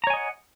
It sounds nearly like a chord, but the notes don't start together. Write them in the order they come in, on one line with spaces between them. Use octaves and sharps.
A#5 C#5 G#5 D#5 F#5